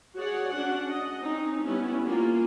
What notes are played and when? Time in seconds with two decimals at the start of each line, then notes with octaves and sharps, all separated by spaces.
0.17 F#4 G#4 C#5 D5 F#5
0.50 C#4 D4 F#4 F#5
0.89 D#5
1.21 C4 C#4 D#4
1.64 G3 B3 C#4 E4 G4
2.05 A#3 C#4 F4